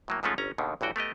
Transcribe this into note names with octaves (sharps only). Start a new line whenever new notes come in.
A2 F#3 A#3
G#2 F3 G#3 A3 C#4 F4
G1 C#4 A#5
D#2 B2 D3 D#3
A1 G2 E3 F#4 G5
A3 B3 G4 D#5